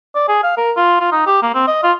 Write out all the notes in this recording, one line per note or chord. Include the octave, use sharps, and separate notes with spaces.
D5
G#4
F5
A#4
F4
F4
D#4
G4
A#3
C4
D#5
F4